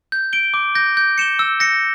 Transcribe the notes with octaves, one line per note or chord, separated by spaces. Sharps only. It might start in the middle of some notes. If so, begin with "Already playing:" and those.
G6
D7 G7
D6
G6 A#6
G6
C#7 E7 G7
E6
A#6 C#7